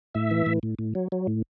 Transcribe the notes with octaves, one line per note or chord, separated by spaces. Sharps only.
A2 E5
E3
A2
A2
A2
F#3
F#3
A2